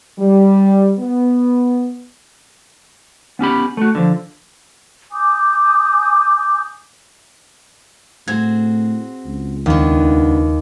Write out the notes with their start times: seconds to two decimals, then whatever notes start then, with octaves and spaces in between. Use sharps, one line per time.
0.19 G3
0.99 B3
3.39 B3 C#4 G4 B5
3.77 A3 F#4
3.95 D3 F3
5.12 G#5 D6 D#6 G6
8.28 A2 C4 F#4 G#4 G#6
9.26 C#2
9.66 D#2 B3 D4